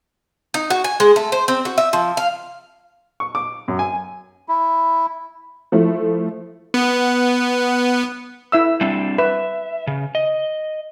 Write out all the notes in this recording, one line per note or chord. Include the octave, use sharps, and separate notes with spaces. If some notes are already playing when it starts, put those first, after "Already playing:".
D#4
F#4
G#5
G#3
A3
C5
C4
F#4
E5
F3
F5
C#6
D6
F#2
G#5
E4
F3 A3 E4
B3
E4 E5 E6
G3 C4 D4
B4 E5
C#3
D#5